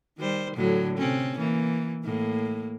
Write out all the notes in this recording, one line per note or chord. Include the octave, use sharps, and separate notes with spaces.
D#3 G3 C5
A2 D3 F#3
C3 C4 C#4
E3 A#3
A2 A#3